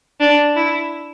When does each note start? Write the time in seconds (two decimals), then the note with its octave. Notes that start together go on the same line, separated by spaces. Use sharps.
0.20 D4
0.56 E4